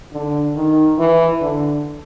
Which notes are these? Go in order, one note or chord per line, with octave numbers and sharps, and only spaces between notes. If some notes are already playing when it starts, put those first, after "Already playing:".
D3
D#3
E3
D3